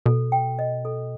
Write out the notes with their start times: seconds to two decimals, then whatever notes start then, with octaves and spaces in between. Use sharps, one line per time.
0.06 B2 A4
0.32 G5
0.59 D#5
0.85 A4